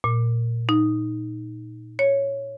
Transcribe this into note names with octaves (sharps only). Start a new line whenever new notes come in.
A#2
D#4
C#5